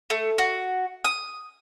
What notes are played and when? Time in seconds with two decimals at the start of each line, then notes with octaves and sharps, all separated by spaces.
0.10 A3
0.38 F#4
1.04 D#6